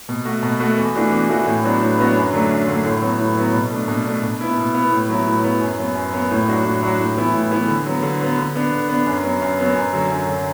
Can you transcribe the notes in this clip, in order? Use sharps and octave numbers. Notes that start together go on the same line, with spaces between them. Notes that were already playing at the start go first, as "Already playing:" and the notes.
B2
A3 F#4
B2
A3 F#4
E2
E3 A3 D4 F#4
E2
E3 A3 D4 F#4
A2
F#3 B3 D4 F#4
A2
F#3 B3 D4 F#4
F#2
D3 F#3 A3 D4
F#2
D3 F#3 A3 D4
A2
F#3 B3
A2
F#3 B3
B2
A3 D4
B2
A3 D4
B2
B3 E4
B2
B3 E4
A2
F#3 B3 E4
A2
F#3 B3 E4
F#2
F#3 B3
F#2
F#3 B3
A2
F#3 D4 F#4
A2
F#3 D4 F#4
A2
E3 B3 E4
A2
E3 B3 E4
D3
F#3 B3
D3
F#3 B3
D3
B3 D4
D3
B3 D4
F#2
F#3 B3
F#2
F#3 B3
F#2
D3 F#3
F#2
D3 F#3